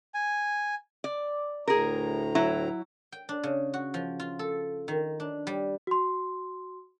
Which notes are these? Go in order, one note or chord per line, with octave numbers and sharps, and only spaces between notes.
G#5
D5
D2 A2 G#4 A#4 A#5
F#3 E4 C#5
G5
D4
C#3
F#4
F3
F4
A4
D#3
D4
G3
F#4 C6